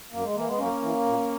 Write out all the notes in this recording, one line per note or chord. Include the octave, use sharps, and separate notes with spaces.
F#2 A#3
G#3
E3 A#3
G#3 B3
F#2 A#3 C#4
E3
A#2